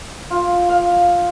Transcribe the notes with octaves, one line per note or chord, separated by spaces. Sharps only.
F4
F5